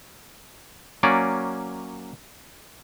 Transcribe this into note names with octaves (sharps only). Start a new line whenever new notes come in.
F#3 A#3 C#4 D5